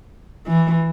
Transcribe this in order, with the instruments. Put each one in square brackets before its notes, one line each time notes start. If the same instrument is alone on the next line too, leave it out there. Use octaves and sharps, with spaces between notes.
[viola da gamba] E3